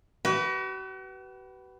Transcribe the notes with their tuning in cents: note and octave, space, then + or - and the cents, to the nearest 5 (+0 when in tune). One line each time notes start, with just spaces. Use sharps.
F#4 +45 B4 +0